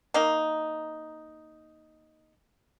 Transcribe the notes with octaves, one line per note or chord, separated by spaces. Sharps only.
A#3 D#4